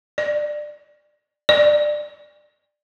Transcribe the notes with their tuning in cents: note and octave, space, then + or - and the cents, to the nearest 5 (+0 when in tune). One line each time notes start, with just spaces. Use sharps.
D5 +15
D5 +15